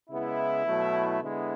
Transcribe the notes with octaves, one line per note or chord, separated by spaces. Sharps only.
C#3 G#3 B3 E4
B2 F#3 A3
D3 G#3 B3 E4